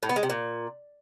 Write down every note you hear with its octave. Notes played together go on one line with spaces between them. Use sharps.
A2
B3
G#3
C3
A#2